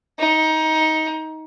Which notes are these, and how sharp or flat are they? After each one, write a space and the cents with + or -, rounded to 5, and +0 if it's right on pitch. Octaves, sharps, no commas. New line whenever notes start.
D#4 +20